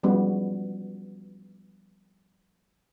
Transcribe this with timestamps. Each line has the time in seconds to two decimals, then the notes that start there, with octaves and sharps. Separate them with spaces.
0.03 F3 G3 G#3 B3 C#4 F#4